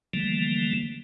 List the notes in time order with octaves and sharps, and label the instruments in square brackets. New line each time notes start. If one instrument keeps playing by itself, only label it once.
[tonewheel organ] D3 E3 F3 G3 A3 A#3